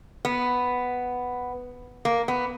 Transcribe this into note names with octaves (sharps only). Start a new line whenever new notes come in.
B3
A#3
B3